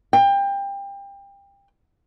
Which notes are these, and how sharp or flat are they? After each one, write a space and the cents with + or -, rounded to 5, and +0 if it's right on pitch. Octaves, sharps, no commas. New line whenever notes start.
G5 +25